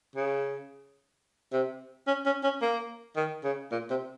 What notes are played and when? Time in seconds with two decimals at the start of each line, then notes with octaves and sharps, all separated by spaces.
0.16 C#3
1.53 C3
2.07 C#4
2.26 C#4
2.44 C#4
2.62 A#3
3.16 D#3
3.44 C#3
3.71 A#2
3.90 C3